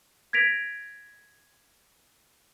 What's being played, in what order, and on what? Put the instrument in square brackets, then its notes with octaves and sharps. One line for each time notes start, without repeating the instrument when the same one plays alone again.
[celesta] G#6 A#6 B6 D7 F7